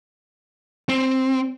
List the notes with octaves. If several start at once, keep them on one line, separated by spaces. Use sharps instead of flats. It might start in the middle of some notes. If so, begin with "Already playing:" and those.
C4